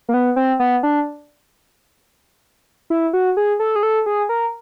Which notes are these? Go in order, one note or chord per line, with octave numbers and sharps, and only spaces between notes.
A#3
B3
C4
B3
D4
E4
F#4
G#4
A4
G#4
A4
G#4
A#4